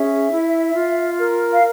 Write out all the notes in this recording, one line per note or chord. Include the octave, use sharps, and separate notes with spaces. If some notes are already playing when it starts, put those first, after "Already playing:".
Already playing: C#4 G#4 E5
E4
F4
A#4
F5